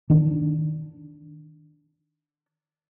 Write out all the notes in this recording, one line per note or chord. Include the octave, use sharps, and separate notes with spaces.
D#3 D4